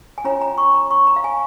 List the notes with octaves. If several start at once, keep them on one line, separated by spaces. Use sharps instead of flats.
G#5
C#4 F4 C#5 A#5
A#5
C#6
A#5
C#6
A#5
F5
G#5